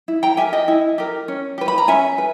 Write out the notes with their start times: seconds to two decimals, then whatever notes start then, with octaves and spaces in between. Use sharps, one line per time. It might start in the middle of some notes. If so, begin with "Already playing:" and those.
0.08 E4
0.23 G5 A#5
0.37 G4 A#4 E5 G#5
0.53 D#5 G5
0.68 E4
0.98 G4 A#4
1.28 C#4
1.58 G4 B4
1.68 B5
1.78 A#5
1.88 C#4 E5 G#5
2.18 B4